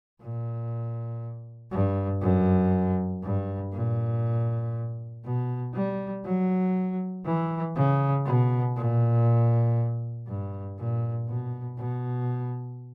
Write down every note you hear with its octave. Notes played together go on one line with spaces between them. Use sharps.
A#2
G2
F#2
G2
A#2
B2
G3
F#3
E3
C#3
B2
A#2
G2
A#2
B2
B2